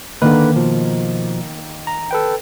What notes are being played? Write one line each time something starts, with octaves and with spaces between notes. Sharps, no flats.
D3 D#3 A#3 B4
B2 F3
A#5
A4 B4 G5